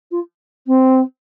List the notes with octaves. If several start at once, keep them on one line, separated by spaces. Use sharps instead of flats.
F4
C4